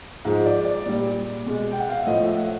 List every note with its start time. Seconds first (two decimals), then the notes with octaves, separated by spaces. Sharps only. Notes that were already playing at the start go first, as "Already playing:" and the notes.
0.25 G#2 F3 G#3
0.45 D5
0.65 D5
0.86 A#2 G3
1.46 B2 G#3
1.72 G5
1.80 F#5
1.89 F5
1.99 E5
2.06 A2 F3 A3 D#5
2.22 E5
2.37 F#5